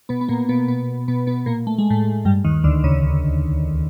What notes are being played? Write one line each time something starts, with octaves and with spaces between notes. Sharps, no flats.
B2 B3
B3
A#2 A#3
B2 B3
B2 B3
B2 B3
B2 B3
A#2 A#3
A3
G#3
A2 A3
G2 G3
D#2 D#3
D2 D3
C#2 C#3